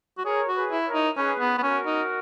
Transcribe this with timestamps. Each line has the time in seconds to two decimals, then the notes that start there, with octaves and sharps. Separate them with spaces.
0.18 F#4
0.25 G#4 A#4 C#5
0.48 F#4
0.55 G#4 B4
0.72 E4
0.86 A#4 C#5
0.94 D#4
1.17 C#4 G#4 B4
1.40 B3
1.58 B3
1.63 C#4 F#4 A#4
1.86 D#4